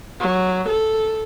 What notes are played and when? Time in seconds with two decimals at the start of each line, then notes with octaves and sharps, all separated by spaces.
0.21 F#3
0.69 A4